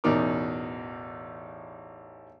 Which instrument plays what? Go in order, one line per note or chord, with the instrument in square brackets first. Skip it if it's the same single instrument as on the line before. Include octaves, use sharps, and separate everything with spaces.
[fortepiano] A1 E2 B2 D#4 A#4 D6